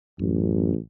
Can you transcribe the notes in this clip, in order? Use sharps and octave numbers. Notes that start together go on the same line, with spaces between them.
A1 F#2